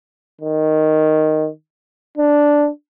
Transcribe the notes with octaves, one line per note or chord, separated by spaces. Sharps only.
D#3
D4